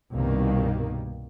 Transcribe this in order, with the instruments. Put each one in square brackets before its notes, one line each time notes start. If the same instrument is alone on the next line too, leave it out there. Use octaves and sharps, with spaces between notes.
[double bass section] C2 G2 B2 D#3 A#3